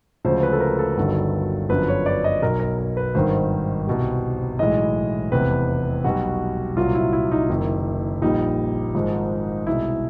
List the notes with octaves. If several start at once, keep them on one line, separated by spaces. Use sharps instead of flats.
D2 C#3 F3 G#3 C5
B4
A4
A#4
A4
G1 G2 D#3 F#3
G1 F#2 D3 F3 B4
C#5
D5
D#5
B1 B2 F#3 A#4
A#4
A#4
B4
G#1 G2 D#3 C5
C2 B2 G3
B1 A2 E3 G#3 D#5
F1 E2 C3 B4
B1 B2 G3 F#4
C2 A#2 F#3 F4
E4
E4
D#4
F#1 F#2 D#3 E4
A#1 A#2 G3 D#4
G#1 G#2 F3 G#3
C2 B2 G#3 E4